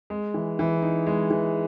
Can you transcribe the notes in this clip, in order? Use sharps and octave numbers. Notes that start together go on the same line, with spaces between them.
G#3
E3
E3
D#4
G#3
E3